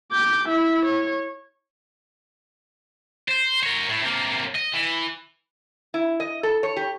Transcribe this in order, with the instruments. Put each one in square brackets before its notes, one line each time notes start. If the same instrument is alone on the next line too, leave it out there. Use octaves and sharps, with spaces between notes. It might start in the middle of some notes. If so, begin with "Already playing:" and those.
[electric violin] D6 G6
E4 E5
C#5
[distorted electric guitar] C5
A#4 C#5
A2
C3 A#3
D#5
E3
[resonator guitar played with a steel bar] E4
D#5
A4
C#5
G4